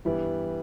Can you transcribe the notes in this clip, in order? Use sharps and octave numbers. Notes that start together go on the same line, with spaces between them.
G2 E3 G3 B3 E4